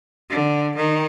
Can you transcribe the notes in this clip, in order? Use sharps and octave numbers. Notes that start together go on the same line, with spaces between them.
D3
D#3